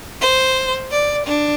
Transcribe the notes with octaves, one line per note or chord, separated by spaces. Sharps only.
C5
D5
D4